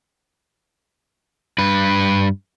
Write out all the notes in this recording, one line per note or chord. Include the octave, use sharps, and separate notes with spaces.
G2 B4